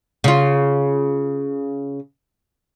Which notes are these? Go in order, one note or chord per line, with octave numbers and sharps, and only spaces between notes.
C#3 F4